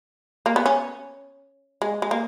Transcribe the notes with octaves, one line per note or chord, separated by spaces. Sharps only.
A#3
B3
C#4
G#3
G#3
A#3